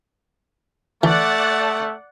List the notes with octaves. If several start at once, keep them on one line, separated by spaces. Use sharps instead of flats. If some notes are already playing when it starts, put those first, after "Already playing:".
E3 A3 D5 F#5 A5